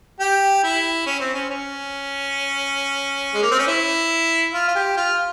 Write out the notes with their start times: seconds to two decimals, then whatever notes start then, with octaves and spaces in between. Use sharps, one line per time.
0.20 G4
0.64 E4
1.06 C#4
1.20 C4
1.34 C#4
1.50 C#4
3.34 G#3
3.42 A#3
3.51 C4
3.59 C#4
3.67 E4
4.53 F4
4.68 F4
4.75 G4
4.97 F4